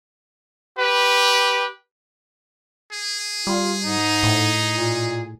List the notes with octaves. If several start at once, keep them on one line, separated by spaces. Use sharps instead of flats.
G4 B4
G#4
G3 F4
G#2 D#4
A2
A#2